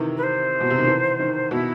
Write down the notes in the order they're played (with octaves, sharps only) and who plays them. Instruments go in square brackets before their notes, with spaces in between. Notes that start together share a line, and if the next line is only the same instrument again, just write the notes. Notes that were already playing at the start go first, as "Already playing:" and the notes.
Already playing: [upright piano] C3 D#3 E3
[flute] B4
C5
[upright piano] B2
C3
D#3
E3
D#3
[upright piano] B2 [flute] E4